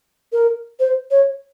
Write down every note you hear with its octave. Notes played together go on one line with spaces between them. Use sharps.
A#4
C5
C#5